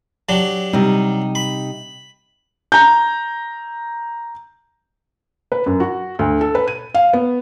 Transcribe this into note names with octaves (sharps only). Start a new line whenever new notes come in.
F#3 D4 G4
C3 G3 D#4
B5
A#5 G6
B4
F#2
F#4
D2
A4
B4
D#7
F5
B3